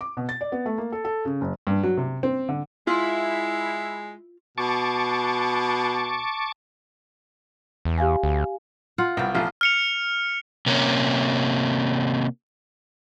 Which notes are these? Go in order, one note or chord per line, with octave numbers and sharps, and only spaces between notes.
D6
B2
A6
D5
B3
A3
A#3
A4
A4
C#3
F#1
G2
F#3
C3
C4
D3
G#3 E4 F4
B2 A5 C#6 D6
E2
G4 F5 G#5
D2
F4 F#5
C2 B3 G5
A1 F3 F4
F6 C#7 F7
C3 A#3 C#4